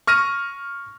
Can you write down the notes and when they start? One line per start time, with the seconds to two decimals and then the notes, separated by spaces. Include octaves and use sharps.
0.07 C#6 F6 A#6 D#7